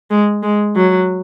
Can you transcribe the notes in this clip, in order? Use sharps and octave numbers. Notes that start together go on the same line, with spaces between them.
G#3
G#3
F#3